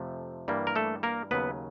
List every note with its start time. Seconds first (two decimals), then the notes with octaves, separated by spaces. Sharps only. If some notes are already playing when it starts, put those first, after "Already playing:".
Already playing: F2 C3 F3 A3
0.48 G2 E3 G3 A#3
0.67 A#4
0.76 A3 A4
1.03 A#3 A#4
1.31 D#2 C#3 F#3 B3 B4